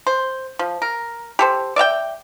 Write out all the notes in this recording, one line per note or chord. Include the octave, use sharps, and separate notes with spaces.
C5
F3
A#4
G4 A4 C5
D5 E5 F5 G5